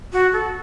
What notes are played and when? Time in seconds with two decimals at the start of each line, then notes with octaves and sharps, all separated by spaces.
0.13 F#4
0.33 A4